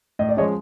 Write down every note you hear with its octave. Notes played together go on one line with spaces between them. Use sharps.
A2 D#5
D5
F3 G#3 C#4 C#5 D#5